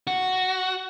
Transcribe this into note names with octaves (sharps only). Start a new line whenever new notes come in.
F#4